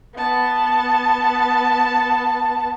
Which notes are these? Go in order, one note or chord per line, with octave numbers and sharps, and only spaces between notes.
B3 A5